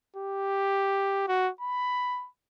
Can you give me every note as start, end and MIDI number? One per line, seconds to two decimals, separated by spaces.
0.16 1.26 67
1.28 1.49 66
1.61 2.27 83